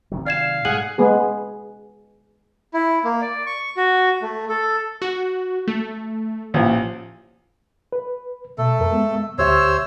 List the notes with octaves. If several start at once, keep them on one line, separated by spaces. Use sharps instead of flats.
C3 D#3 F#3
D5 F5 G#6 E7
G#2 B2 G3 G#4 F#5 F#7
G#3 B3 G#4
E4
A#3
D5
C#6
F#4
A3
A4
F#4
A3
A1 A#2 F3
B4
B2 A3 A4
F2 A#4
G#3 B3
D2 G4 C5 C#5 E5 E6